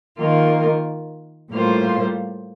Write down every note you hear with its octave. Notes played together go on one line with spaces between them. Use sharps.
D#3 A#3 F4 A#4
A2 G3 A#3 F4 C5